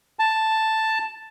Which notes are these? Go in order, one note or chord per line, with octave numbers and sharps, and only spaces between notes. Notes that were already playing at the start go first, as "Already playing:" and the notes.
A5